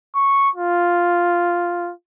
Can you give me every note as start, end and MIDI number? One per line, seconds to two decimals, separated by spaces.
0.15 0.50 85
0.55 1.92 65